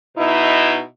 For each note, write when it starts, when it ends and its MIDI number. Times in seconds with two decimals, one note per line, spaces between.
0.17 0.82 47
0.17 0.82 63
0.17 0.82 64